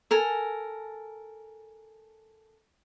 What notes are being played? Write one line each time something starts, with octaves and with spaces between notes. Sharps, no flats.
A4 A#4 G#5